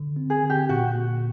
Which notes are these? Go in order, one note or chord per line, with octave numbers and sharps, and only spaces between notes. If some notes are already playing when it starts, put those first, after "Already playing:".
Already playing: D3
C4
G#4
D3
G4
A#2 F#4
A#3